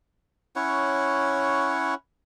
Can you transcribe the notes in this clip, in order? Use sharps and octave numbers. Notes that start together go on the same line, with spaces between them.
C#4 E4 C#5 F#5